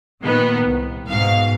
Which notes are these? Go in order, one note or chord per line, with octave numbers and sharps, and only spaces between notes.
A#2 D#3 B3
C2
G#2 B2 F5